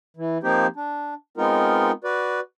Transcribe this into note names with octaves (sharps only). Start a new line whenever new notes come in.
E3
F3 A#3 C4 D#4 G4 C5
D4
G#3 B3 C4 D#4 F4 A#4
F#4 B4 D5